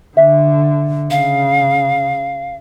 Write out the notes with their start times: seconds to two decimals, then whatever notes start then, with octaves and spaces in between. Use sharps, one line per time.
0.17 D3 E5
1.10 C#3 F5